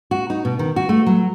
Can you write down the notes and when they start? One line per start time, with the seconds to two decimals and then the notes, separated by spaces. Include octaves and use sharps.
0.11 F#4
0.30 D#4
0.45 B2
0.59 D#3
0.76 F#4
0.89 A3
1.06 F#3